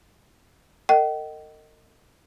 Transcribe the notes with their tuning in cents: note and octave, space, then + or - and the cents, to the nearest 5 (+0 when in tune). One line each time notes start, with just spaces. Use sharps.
A#4 -45 D#5 -5 G5 -45